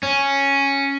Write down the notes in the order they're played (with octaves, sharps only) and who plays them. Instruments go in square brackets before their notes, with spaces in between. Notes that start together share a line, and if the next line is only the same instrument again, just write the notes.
[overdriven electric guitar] C#4